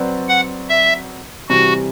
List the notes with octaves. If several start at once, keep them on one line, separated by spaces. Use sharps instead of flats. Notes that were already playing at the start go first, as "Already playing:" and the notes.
Already playing: F#3 C4 F#4 B4 D5
F#5
E5
C3 E3 G3 F#4